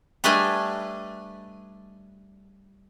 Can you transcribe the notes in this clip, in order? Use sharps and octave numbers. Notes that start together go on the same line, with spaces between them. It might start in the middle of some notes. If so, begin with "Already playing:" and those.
G3 A3 D4 B4 D#5 G#5